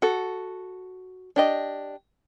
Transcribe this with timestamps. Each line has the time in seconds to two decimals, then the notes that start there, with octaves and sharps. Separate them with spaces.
0.02 F#4 A4
1.36 D4 G4 D#5